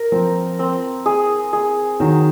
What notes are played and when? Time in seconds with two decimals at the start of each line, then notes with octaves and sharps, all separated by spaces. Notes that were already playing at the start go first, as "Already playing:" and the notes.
Already playing: A#4
0.12 F3 C4
0.59 C4
1.06 G#4
1.53 G#4
2.00 D#3 F#3